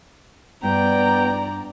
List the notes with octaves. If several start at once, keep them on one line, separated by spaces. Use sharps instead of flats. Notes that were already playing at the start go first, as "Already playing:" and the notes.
G2 B3 D5 G5 A#5